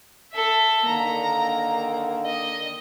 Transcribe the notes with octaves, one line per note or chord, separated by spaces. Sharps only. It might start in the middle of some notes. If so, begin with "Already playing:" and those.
A4 E5
D3 D#3 A#3 A#5
D#5